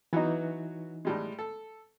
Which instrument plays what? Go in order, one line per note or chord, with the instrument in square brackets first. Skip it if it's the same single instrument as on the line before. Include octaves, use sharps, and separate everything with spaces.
[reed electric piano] E3 D#4 [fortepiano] F#3 B3 F#4
[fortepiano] A2 G3 G#3
A4